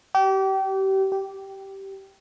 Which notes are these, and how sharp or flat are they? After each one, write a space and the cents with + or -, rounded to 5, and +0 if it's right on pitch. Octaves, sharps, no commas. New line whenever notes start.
G4 -30
G4 -10